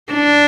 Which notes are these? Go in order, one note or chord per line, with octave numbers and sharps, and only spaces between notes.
D4